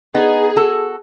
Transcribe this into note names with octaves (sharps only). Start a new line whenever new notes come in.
B3 D#4 G#4
F#4 A4